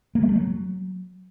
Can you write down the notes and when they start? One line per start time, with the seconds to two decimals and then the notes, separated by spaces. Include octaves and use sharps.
0.15 A#3
0.22 G3
0.29 A3
0.36 F#3